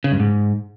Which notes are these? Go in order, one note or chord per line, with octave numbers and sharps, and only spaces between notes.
C#3
G2
G#2